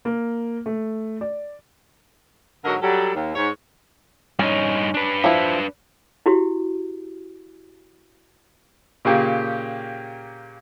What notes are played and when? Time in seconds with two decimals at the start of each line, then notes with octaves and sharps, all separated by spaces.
0.05 A#3
0.66 A3
1.21 D5
2.65 G#2 D3 F#3 F#4 A#4 D#5
2.82 F#3 G3 A4
3.14 D#2
3.35 G#2 C#5
4.39 G2 C#4 D#4
4.94 D4 B4
5.24 F3 E4
6.26 E4 F#4 G4
9.05 A#2 C#3 A#3 G4